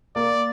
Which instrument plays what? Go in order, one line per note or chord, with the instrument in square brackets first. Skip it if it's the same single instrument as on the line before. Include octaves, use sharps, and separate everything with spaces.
[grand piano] A#3 [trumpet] D5